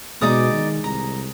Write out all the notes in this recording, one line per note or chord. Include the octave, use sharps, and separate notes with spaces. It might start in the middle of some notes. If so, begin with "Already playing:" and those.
B2 G#3 D#4 D5 D#6
D#3
C2 A#5